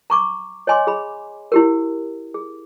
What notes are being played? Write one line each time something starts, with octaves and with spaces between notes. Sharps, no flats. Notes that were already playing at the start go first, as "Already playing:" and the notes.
A#5 C#6 D6
C#5 D#5 G#5 C6 D6
G#4 B5
E4 G4 A#4
G#4